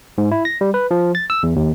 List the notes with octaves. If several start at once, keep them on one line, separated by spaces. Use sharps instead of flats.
G#2
E4
A#6
G3
B4
F3
A6
E6
E2
D#2